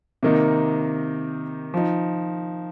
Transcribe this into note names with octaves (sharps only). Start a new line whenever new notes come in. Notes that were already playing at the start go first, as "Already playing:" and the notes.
C3 D#3 A#3 D#4
F3 D#4